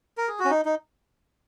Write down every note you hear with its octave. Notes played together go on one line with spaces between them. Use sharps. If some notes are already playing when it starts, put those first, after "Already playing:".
A#4
G#4
F#4
C#4
D#4
D#4